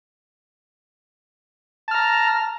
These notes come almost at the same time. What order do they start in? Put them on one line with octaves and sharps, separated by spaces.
A5 F6 A#5